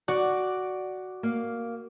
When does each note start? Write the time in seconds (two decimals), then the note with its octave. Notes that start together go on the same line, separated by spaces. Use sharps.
0.08 F#4 D5
1.23 A#3 F5